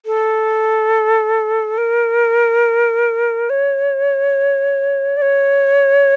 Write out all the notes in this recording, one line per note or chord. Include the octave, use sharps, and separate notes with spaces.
A4
A#4
C#5
D5
C#5